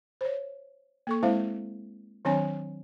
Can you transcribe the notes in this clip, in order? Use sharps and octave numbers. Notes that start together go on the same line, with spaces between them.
C5 C#5
A#3 A4 C#6
G#3 C4 E4 C5 F5
D#3 F#3 C4 D4 C#5 G#5